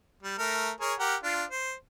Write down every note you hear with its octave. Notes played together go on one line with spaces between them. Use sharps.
G3
A3 A#4
G#4 A#4 C#5
G4 A#4 F#5
D4 F4
C5